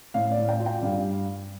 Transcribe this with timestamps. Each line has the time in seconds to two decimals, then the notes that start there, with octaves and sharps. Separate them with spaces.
0.14 A2 F5
0.31 D5
0.37 A2
0.49 G5
0.60 F4
0.66 G5
0.83 G2 F5